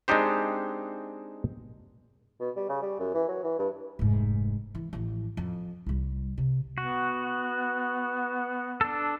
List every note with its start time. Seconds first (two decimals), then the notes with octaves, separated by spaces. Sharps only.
0.08 G#3 C4 D4 D#4 G4 C5
2.40 B2
2.56 G3
2.69 C#3
2.82 G3
3.00 F#2
3.14 E3
3.28 F#3
3.44 E3
3.59 G2
3.99 F1 G#2
4.75 E3
4.93 A1 F3
5.37 F2
5.86 C2 G3
6.38 C3
6.78 B3 F#4
8.81 D4 A4